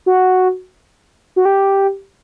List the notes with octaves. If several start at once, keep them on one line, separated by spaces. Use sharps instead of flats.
F#4
F#4
G4